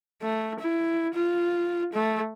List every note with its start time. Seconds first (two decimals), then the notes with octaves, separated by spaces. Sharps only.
0.22 A3
0.59 E4
1.14 F4
1.93 A3